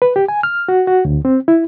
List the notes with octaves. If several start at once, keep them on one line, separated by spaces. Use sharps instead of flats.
B4
G4
G#5
F6
F#4
F#4
D2
C4
E4